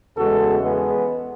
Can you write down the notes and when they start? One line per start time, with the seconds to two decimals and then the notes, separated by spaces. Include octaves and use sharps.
0.17 E2 C#3 E3 G#3 F#4 A4
0.62 G#3 B3